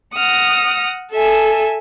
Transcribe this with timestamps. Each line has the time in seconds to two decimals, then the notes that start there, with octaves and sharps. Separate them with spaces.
0.15 F#5 D#6 F6 A#6
1.12 A4 E5 G#5